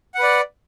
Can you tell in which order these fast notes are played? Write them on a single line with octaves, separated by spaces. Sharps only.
F#5 B4 D5